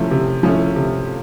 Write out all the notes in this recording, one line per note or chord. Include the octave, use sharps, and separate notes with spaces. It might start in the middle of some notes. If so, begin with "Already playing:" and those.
Already playing: C3 F3 A3 C#4 E4
C3
F3 A3 C#4 E4
C3